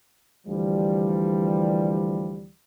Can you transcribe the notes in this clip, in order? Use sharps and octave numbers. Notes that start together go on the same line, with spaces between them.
D2 E3 F3 G3